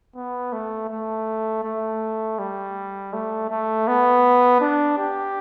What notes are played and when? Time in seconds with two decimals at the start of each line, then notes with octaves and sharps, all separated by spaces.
0.16 B3
0.53 A3
0.90 A3
1.64 A3
2.39 G3
3.13 A3
3.50 A3
3.88 B3
4.61 D4
4.98 G4